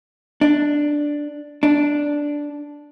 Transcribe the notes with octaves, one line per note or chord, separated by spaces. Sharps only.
D4
D4